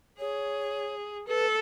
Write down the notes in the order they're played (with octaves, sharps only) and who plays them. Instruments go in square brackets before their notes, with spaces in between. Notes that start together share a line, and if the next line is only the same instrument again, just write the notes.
[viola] G#4 [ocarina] C#5
[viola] A4 [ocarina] B4